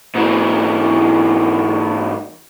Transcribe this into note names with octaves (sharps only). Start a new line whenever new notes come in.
G#2 E3